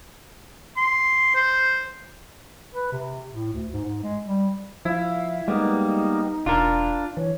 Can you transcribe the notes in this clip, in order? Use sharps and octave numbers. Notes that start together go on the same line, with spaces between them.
C6
C5
B4
C3
A2
D2
G#2
G#2
G#3
G3
F3 E4 F5
G3 G#3 A#3 B3 D#4
E1 D4 F4 A#4
E3 C#5